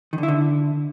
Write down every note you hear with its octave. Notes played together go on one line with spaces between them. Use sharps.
D#3
D3
E4
D3